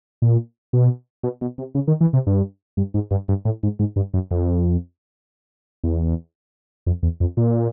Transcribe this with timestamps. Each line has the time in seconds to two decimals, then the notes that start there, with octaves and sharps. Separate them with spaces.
0.22 A#2
0.73 B2
1.23 B2
1.41 B2
1.58 C3
1.75 C#3
1.88 D#3
2.01 E3
2.13 C3
2.27 G2
2.77 G2
2.94 G#2
3.11 G2
3.28 G2
3.45 A2
3.63 G#2
3.79 G#2
3.96 G2
4.14 F#2
4.31 F2
5.84 E2
6.87 F2
7.03 E2
7.20 F2
7.37 A#2